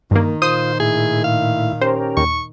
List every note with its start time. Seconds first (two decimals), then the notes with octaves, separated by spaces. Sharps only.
0.11 G2 D#3 A#3
0.42 A#2 D#3 F4 C5 D#6
0.80 A2 E4 G#4
1.24 F5
1.81 C#4 G4 A#4 C5
2.17 D#2 C#6